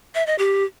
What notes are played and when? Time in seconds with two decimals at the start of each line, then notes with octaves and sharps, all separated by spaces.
0.15 E5
0.27 D#5
0.38 G4